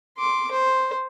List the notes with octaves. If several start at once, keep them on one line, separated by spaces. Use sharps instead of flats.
C6 D6
C5